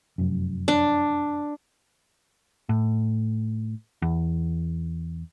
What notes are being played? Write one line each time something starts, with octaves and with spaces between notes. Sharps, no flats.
F1 F#2
D4
A2
E2